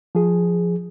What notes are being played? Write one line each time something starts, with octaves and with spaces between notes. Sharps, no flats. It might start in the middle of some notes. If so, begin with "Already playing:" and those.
F3 G#4